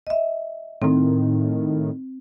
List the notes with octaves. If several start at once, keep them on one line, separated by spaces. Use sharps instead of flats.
D#5 E5
A2 D#3 C4